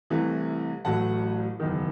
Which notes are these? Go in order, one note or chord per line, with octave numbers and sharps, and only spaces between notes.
C2 C3 E3 A3
A1 A2 F#3 A3 F#5 A5
F#1 E2 D#3